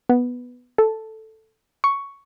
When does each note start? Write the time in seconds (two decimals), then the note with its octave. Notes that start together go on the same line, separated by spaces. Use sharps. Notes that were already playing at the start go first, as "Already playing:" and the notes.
0.09 B3
0.78 A4
1.84 C#6